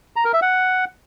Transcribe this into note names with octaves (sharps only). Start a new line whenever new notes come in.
A#5
A#4
E5
F#5